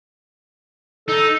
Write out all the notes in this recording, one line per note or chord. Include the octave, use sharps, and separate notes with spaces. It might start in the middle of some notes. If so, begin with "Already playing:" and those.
D#4 A4